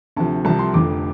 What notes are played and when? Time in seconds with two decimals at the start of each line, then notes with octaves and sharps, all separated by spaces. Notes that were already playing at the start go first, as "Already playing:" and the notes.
0.16 D2 C3 F3 A5
0.45 C2 C3 F3 A5
0.59 C6
0.74 F1 F2 D3 F3 D6